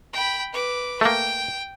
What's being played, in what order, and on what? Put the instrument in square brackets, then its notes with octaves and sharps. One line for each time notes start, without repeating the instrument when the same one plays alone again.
[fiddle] G5 B5
B4 D6
[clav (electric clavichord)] A3 A#3 [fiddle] G5